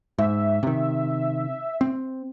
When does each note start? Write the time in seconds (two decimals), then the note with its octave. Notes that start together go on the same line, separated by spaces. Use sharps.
0.18 G#2 E5
0.63 C3 D#3
1.81 C4